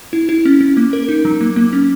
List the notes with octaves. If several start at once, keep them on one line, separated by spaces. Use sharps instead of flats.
E4
E4
C#4
C#4
A#3
A#4
D#4
F#3
A#3
A#3
C#4